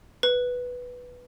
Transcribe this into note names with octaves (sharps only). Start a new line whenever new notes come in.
B4